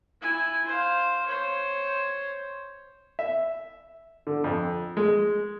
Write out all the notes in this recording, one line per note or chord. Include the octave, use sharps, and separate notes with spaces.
E4 G#5
C5 F5
C5 C#5
E5
D3
F2
G#3